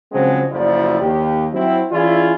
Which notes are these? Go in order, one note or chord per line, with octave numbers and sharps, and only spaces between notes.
C#3 F3 F#3 G#3 C4
F#1 D2 F3 E4 D5
D#2 G4
F#3 C4 E4
E3 C#4 E4 F4 G#4 D5